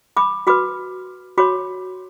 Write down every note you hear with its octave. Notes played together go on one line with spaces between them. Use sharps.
B5 D6
F#4 B4 B5 D6
F#4 C#5 B5 D6